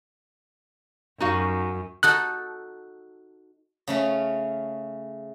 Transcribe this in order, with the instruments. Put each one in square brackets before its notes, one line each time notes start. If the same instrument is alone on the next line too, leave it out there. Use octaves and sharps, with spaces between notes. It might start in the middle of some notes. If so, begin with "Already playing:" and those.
[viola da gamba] F#2 [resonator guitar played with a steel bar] D#4 F#4 F5
[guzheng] D#4 F#4 A4 [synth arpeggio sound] F#6
[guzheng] C#3 A3 C#4